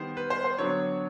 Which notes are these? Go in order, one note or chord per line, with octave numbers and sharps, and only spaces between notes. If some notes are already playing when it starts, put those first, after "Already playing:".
Already playing: D#3 G3 B3 C5
B4
C5
C5
D3 F#3 B3 D4 C#5